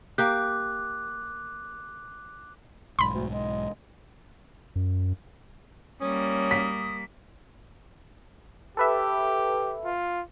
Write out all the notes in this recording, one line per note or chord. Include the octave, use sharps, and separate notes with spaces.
A#3 G4 D6 F#6
B1 G#2 B5 C6
D2
G#3
F#2
G3 A#3 C#4 D#6
B6
G4 A4 B4 E5
F4